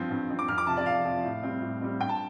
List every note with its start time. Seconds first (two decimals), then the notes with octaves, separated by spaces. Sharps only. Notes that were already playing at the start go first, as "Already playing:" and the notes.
Already playing: G2 F3 C4
0.10 G2
0.30 F3 C4
0.39 D6
0.48 F2 F6
0.58 D6
0.67 C3 F3 A5
0.77 D5
0.86 F2 F5
1.05 C3 F3
1.24 A2
1.43 G3 C4
1.62 A2
1.81 G3 C4
2.01 G2 G5
2.09 A5